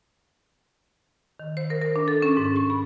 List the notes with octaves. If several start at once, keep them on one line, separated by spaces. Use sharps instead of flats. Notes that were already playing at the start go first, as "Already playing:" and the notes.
D#3
C5
A#4
A#4
D4
A4
C#4
G#2
C#6
B5